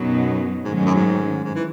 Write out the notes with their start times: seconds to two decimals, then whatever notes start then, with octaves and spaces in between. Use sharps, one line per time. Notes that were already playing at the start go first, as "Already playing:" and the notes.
Already playing: F#2 B2 F#3 B3 D#4
0.64 G#2 D#3 F#3 A3 C#4
0.75 G#2
0.85 F#2
0.95 G#2
1.44 G#2
1.55 E3